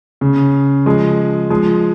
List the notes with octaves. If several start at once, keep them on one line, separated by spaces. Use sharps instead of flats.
C#3
F3 G#3
F3 G#3